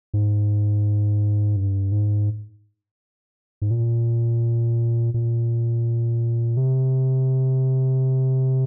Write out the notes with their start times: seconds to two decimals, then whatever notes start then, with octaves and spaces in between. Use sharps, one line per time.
0.14 G#2
1.56 G2
1.92 G#2
3.62 G#2
3.71 A#2
5.14 A#2
6.57 C3